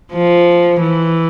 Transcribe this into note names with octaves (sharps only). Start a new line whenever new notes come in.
F3
E3